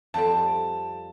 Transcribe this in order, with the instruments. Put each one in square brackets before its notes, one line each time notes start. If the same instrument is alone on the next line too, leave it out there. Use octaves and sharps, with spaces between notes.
[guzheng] F2 G3 C4 [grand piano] A5